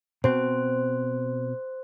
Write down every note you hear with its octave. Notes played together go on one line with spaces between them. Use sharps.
B2 C4 C5